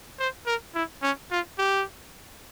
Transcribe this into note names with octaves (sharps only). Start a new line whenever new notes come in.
C5
A#4
E4
C#4
F4
G4